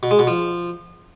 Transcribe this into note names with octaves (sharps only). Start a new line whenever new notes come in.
B2
G#3
B2
F3